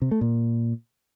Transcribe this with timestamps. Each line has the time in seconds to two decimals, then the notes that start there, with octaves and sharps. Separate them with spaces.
0.02 C3
0.11 A3
0.21 A#2